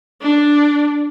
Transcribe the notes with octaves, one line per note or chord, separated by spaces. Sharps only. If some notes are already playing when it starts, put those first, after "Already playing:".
D4